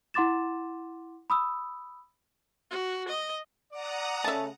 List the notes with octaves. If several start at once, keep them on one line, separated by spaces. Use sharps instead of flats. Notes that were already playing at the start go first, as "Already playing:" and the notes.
E4 F#5 C6 D6 A6 E7
B5 D#6 E6
F#4
D#5
D5 F#5 A#5 D#6
C#3 A3 E5 A5